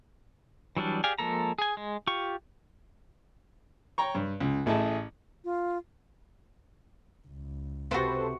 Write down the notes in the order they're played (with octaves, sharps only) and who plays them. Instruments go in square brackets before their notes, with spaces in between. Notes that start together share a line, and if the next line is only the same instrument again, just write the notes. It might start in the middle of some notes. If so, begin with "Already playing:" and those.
[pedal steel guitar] E3 F#3 G3 D4
G4 G#4 D5 F5 G#5
F3 G#3 A#3 A4 A#5
G#4 G#5
G#3
F4 G4 C#6
[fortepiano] C#5 G5 A#5 C#6
G2
C#2
A1 A3 E4 G#4 D#5 A5
[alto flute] F4
[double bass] C#2
[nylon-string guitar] C3 G4 [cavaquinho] E4 F#4 [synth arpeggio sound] A4 B4 C5